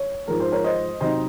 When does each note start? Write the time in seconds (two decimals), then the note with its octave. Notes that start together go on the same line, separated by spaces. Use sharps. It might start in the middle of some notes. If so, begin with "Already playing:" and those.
Already playing: C#5
0.28 G#2 F3 G#3 A#4
0.40 C5
0.52 A#4 C#5
0.64 C5 D#5
1.01 C3 F#3 C4 D#4 C5 D#5